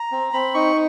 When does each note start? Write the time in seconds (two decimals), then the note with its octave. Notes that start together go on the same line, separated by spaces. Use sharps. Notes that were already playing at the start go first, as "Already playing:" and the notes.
Already playing: A#5
0.12 C4
0.33 C4 B5
0.54 D#4 C#6